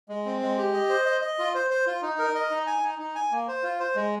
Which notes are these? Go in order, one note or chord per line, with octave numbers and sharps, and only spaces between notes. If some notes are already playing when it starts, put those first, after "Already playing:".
G#3
C4
G#3
G4
D#5
C5
D#5
D#5
F4
C5
C5
F4
D#4
A#4
D#5
D#4
G#5
D#4
D#4
G#5
A#3
C5
F4
C5
G#3